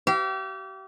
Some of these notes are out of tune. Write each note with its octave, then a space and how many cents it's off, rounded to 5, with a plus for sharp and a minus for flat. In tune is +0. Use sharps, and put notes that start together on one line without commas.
G4 -35 F5 -45